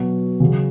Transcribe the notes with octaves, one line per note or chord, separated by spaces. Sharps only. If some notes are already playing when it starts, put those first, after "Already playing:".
Already playing: B2 F#3
C#3 F#3